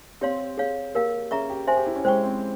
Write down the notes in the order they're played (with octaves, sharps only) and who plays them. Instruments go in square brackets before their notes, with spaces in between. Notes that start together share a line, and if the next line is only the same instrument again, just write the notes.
[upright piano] C4 [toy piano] G4 C#5 F5 C6
[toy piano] G#4 C#5 F5
[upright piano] A#3 [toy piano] G4 A#4 F5
[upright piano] C#4 [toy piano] G#4 E5 A#5 C#6
[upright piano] G4
[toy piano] C5 E5 G#5 C6
[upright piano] G4
E4
C#4
[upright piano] G#3 [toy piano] C5 G5 C#6
[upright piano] C4